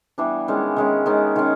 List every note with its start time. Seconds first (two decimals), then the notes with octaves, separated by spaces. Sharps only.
0.18 E3 G3 B3 D4
0.48 D#3 G#3 C#4
0.76 D#3 G#3 C#4
1.06 D#3 G#3 C#4
1.36 D#3 G#3 C#4